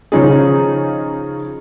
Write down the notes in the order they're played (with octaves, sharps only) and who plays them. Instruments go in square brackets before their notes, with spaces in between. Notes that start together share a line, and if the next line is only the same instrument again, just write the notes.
[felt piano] C#3 F3 C#4 D#4 F4 G#4